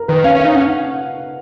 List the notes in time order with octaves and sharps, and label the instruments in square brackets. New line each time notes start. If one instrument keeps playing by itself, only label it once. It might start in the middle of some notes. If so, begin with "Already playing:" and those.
Already playing: [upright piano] A#4
[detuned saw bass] D#3 [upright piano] B4
[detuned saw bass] C#4 [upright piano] F5
[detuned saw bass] C#4
[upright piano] F5
[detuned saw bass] D#4
[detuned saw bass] C#4 [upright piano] F#5